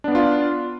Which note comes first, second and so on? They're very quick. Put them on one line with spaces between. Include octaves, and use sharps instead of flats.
D4 B3 D5 F4